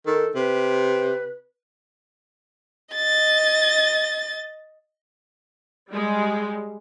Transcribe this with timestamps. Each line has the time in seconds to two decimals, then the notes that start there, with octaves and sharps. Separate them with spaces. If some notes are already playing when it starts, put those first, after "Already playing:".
0.06 D#3 A4
0.36 C3 B4
2.95 D#5 A6
5.90 G3 G#3